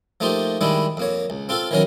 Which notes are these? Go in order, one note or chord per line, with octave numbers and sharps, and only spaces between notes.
F3 A3 A#3 D#4 G4 C5
D#3 G3 G#3 D4 E4
F2 A#3 C#5
C#2
C4 F4 A4 F5
D#3 E3 F#3 C#4 A#4